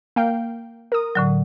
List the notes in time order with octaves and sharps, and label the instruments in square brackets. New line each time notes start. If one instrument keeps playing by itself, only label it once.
[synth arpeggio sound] A#3 F5 G5
A#4 D#6
[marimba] A2 D3 F#3